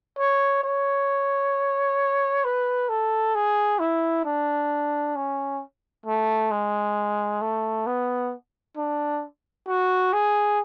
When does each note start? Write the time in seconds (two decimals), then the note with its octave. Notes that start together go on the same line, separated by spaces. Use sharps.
0.18 C#5
0.64 C#5
2.45 B4
2.89 A4
3.35 G#4
3.79 E4
4.25 D4
5.16 C#4
6.06 A3
6.51 G#3
7.42 A3
7.87 B3
8.77 D4
9.67 F#4
10.13 G#4